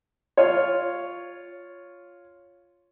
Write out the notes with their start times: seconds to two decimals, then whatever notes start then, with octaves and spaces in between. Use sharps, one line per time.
0.37 F4 C#5